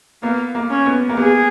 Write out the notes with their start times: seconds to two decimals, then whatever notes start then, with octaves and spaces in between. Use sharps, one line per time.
0.22 A#3 B3
0.55 A#3
0.70 C#4
0.86 B3
1.09 A#3
1.17 B3 G#4